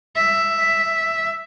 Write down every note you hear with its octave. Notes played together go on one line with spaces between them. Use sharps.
E5